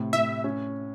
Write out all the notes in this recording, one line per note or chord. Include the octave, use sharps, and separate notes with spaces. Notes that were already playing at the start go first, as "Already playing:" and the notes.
Already playing: A2 C3
A2 E5
C#4